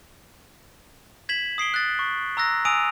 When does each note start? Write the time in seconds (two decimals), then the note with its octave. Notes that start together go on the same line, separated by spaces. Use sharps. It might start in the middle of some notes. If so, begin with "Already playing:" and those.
1.29 G#6 B6 E7 F#7
1.58 D#6 C7 D7 G7
1.74 F#6 A6
1.99 C#6
2.37 A#5 E6 F#6 A#6
2.65 G#5 D#6 E6 D7 D#7 F7